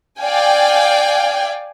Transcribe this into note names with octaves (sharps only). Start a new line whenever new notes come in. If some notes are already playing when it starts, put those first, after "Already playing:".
D5 F5 G5 G#5